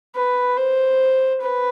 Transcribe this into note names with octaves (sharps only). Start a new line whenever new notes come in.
B4
C5
B4